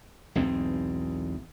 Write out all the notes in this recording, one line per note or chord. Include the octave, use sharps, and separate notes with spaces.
B1 E2 G#2 C4